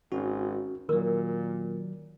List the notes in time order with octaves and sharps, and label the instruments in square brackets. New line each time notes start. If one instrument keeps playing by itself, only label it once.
[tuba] G#1 [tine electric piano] C#4 F#4
[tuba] A#2 [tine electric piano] D#3 F#3 [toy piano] A#4